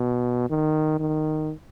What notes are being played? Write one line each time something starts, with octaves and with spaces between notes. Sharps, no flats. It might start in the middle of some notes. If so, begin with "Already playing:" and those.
Already playing: B2
D#3
D#3